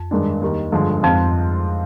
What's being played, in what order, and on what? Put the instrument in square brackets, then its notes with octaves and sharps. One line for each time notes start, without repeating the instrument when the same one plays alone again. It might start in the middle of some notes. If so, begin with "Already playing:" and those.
Already playing: [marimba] F2
[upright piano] G2 D#3 G#3 D4
D#2 D#3 G3
G1 G2 D3 F3 G#3
[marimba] F2 [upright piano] G#2 F3 C4 F4